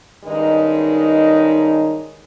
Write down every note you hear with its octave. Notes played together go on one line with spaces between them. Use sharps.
G2 D#3 G#3 C#4 D#4